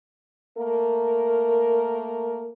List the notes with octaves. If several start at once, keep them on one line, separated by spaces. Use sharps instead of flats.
A3 A#3 A#4